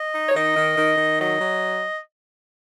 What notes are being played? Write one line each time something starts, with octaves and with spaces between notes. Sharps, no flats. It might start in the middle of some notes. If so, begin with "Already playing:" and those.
Already playing: D#5
D#4
C#5
D#3 D#5
D#3
D#3
D#3
F#3 D#5
F#3